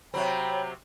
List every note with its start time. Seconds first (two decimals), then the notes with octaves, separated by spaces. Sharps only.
0.14 C3 F#3 C4 C#5 G5 A#5 B5